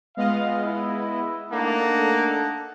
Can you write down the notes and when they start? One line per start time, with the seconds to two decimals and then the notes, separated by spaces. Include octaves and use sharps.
0.17 G#3 B3 F4 D#5 F5
0.63 E4
1.52 A3 A#3 D4 D#4 A4 F#5 A5